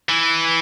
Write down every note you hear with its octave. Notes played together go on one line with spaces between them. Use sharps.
E3